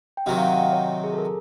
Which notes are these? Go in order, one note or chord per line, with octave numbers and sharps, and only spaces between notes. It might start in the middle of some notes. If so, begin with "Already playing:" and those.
G5
C3 D#3 F#3 F#5
F5
F#5
G5
C#5
G#4
A4
A#4